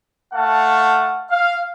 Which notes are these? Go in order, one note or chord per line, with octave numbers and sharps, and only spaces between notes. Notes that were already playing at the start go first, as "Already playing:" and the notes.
A3 F5 F#5 A5
F5